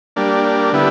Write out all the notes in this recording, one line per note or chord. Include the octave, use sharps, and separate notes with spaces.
G3 A#3 D4
D3 G3 B3 E4